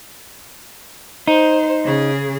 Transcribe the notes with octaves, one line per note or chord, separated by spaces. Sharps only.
D#4 C5
C#3 G#4